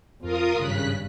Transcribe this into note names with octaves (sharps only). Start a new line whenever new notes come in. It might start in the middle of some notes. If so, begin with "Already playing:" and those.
F2 F4 A#4 D#6
G#1 G2 C#3 F#6 B6